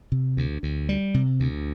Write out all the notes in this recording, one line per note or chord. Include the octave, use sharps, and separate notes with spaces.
C3
D2
D2
G3
C3
D2